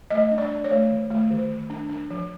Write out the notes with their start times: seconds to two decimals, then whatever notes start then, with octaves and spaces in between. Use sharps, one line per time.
0.10 A3 D#5
0.31 D4
0.38 D5
0.51 D4
0.64 C#5
0.71 A3
0.90 D#3
1.10 A3
1.31 D#3
1.51 D#3
1.70 D4
1.89 D4
2.10 F3